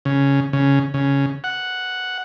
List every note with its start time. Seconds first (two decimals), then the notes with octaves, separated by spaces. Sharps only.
0.05 C#3
0.53 C#3
0.94 C#3
1.44 F#5